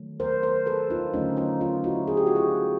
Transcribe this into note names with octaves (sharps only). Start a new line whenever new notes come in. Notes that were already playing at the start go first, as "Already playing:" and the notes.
Already playing: D#3 F#3 A3
A#4 C5
A#4 C5
A4 B4
D#4 F4
D3 F#3 A3 C#4 D#4
D#4 F4
D#4 F4
E4 F#4
G#4
G4
F#4
F4 G4